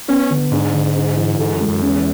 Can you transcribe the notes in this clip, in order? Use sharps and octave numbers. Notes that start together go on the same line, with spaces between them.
B3 C#4
D3
G#2 D4
D3
D4
E3
G#2 A4
F#2
G#3
F#2
E2 C#4